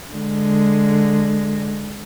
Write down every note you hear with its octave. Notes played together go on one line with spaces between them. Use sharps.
D3 G#3